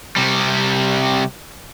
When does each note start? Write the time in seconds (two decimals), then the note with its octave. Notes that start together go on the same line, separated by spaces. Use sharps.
0.16 C3 G3